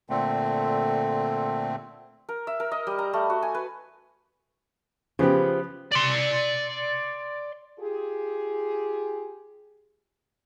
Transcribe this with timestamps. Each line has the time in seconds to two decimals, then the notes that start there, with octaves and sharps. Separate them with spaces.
0.10 A#2 D3 A3 C4
2.29 A#4
2.47 E5
2.60 A#4
2.72 D#5
2.87 G3
2.99 A#5
3.13 A3
3.30 F#4
3.43 G#5
3.55 B4
5.19 C#3 F3 B3 G4
5.92 D5 C6
7.79 F4 G4 G#4